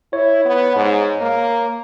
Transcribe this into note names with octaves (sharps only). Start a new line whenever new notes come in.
E4 C#5
B3
G#2
A#3